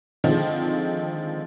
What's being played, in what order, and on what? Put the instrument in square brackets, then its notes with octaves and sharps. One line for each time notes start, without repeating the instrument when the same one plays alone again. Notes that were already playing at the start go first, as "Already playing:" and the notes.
[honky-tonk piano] D3 D#3 F3 G#3 C4